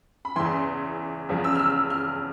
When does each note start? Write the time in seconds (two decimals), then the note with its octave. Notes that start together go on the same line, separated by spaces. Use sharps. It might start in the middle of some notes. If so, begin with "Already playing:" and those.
0.25 B5
0.36 E2 C#3 E3 C6
1.29 E2 C#3 F3
1.44 E6
1.55 F6
1.59 E6
1.90 F6